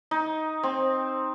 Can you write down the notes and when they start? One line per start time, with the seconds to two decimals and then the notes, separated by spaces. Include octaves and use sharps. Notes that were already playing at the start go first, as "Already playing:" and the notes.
0.11 D#4
0.63 C4